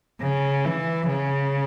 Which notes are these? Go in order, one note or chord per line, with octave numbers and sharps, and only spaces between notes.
C#3
E3
C#3